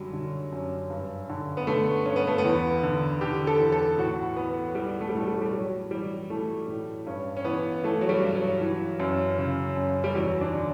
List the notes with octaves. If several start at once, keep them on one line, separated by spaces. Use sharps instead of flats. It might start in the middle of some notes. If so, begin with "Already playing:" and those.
Already playing: F#2 D3 F#3 G3
D3
F#2
G2
D3
B3
D3 A3
G2 C#4
B3
A3
B3
E2
D3
D3 G4
A4
E2
A4
A2 F#4
E3 B3
E3 G3
A3
G3
A2 A3
G3
A3
G3
A2 F#3
E3 G3
E3 A3
A2
G2 C#4
C#4
E3 B3
E3 A3
F#3
G3
G2
F#3
E3
F#2
C#3
F#2
G3
E2 F#3
D4
D3